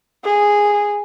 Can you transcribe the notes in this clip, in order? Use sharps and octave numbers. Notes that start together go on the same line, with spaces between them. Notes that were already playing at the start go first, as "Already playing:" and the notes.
G#4